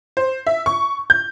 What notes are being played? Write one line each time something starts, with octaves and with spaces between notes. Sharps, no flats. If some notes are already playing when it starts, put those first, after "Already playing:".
C5
E5
C#6
G6